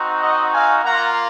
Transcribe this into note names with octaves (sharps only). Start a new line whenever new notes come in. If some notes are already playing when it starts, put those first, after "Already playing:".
Already playing: C4 D#4 F#4
D#5 F#5
F5 G#5
A#3 F4 F#5 A#5